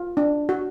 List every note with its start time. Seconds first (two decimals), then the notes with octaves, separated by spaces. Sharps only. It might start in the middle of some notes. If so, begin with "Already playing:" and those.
Already playing: F4
0.17 D4
0.49 F#4